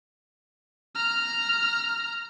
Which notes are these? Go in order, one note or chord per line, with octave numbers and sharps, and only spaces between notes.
A#5 F6